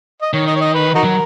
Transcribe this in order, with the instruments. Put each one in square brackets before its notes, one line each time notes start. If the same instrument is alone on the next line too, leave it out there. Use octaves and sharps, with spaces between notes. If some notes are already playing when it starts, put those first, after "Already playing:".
[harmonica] D#5
[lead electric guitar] D#3 [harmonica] C#5
[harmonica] D#5
C#5
D#5
B4
D#4 F#4 A#4
[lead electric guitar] F#3